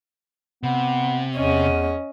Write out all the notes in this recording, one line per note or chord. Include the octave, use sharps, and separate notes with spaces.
C3 B3
E2 C#4 D#5